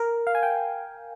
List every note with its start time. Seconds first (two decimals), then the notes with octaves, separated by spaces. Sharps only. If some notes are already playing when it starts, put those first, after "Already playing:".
Already playing: A#4
0.27 F5
0.35 G#5
0.43 G5